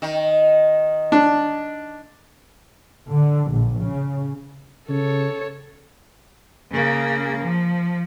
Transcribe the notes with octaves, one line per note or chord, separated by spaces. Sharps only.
D#3
D4
D3
A#1
C#3
C#3 A4 C#5
C#3 A#3
F3